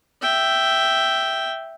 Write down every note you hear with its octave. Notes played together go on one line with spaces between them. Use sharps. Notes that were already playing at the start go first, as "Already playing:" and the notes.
E5 G5